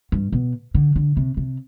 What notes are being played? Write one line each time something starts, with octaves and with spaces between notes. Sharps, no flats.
G2
B2
D3
D3
C3
C3